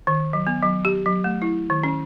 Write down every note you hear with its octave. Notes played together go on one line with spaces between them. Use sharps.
D#3
F#3
B3
F#3
G4
F#3
A3
E4
D#3
C#4